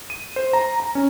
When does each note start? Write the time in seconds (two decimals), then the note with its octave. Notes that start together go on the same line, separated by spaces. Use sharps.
0.10 D#7
0.36 C5
0.53 A#5
0.80 A#5
0.95 C#4